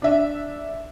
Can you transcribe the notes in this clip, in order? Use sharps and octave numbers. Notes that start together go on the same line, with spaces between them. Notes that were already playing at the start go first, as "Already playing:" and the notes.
D4 E5